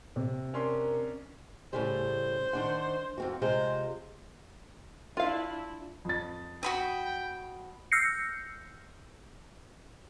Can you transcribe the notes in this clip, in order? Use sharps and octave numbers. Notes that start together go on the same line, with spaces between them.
C3
C#4 D4 A#4 C6
A2 C#3 G3 C5
D#3 D4 F#5
F2 C4 F#4
C3 G#3 F4 C5
D4 E4 F4 F5
F2 A6
F#4 G5 B5 D#6
E6 F6 G6 A#6 C7 C#7